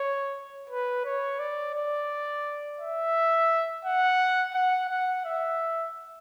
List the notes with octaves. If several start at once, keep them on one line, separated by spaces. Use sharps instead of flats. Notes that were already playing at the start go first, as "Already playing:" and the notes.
Already playing: C#5
B4
C#5
D5
D5
E5
F#5
F#5
F#5
E5